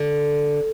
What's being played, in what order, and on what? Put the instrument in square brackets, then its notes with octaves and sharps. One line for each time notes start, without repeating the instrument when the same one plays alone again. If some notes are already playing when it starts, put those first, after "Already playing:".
Already playing: [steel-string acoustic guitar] D3